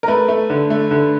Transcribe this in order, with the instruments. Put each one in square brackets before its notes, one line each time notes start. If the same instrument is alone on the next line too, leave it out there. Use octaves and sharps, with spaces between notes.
[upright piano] A#4
A3 B4
A3
D3
A3
D3